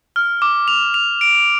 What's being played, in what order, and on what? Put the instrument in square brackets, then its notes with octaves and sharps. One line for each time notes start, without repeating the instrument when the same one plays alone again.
[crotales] F6
D6
F7
F7
D7